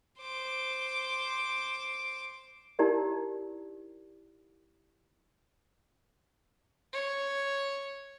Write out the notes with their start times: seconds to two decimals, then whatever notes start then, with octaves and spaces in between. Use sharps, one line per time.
0.20 C5 D6
2.79 D#4 E4 G4 A#4 D5
6.93 C#5